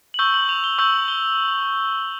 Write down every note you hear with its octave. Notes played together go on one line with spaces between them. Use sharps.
F#7
C#6 E6 G6 G7
F#7
F7
G7
C#6 E6 G6 F#7
G7